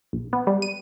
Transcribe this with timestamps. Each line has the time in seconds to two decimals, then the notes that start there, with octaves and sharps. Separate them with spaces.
0.13 A#1
0.33 B3
0.47 G3
0.62 D#7